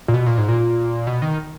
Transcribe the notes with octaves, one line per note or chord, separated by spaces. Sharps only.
A#2
B2
A#2
G#2
A#2
B2
D#3